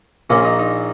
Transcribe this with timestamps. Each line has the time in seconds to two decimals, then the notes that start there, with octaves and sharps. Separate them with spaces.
0.30 A#1 A#2 A#3 C#4
0.44 D#4
0.59 D#4